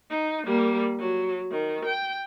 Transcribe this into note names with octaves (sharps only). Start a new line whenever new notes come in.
D#4
G3 A#3
F#3
D#3
G5